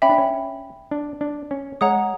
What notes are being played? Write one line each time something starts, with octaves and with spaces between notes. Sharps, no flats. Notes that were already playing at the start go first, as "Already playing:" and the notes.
C#4 E5 G5 B5
D4
C#4
D4
D4
C#4
G#3 C#5 F#5 A#5 D#6